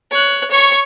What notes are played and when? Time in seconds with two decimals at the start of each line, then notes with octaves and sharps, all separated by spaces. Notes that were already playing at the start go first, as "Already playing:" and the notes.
0.11 C#5 F#6
0.51 C#5 C#6